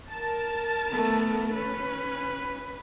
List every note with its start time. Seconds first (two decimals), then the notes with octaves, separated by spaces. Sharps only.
0.10 A#4 A5
0.89 A3 B3
1.55 C#4 B4